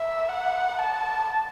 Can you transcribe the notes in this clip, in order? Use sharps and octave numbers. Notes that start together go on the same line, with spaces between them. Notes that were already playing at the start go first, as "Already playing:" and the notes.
Already playing: E5
F#5
A5